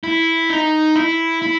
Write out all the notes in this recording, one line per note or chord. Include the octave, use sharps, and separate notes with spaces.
E4
D#4
E4
E4